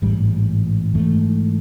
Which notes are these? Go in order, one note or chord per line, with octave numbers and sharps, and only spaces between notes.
A1 G#2 E3 G3
G#2 E3 A3